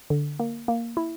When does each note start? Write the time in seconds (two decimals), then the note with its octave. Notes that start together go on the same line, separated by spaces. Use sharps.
0.10 D3
0.40 A#3
0.68 A#3
0.97 E4